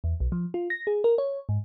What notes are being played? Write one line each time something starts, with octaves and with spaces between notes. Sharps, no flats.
E2
B1
F3
F4
A#6
G#4
A#4
C#5
G#2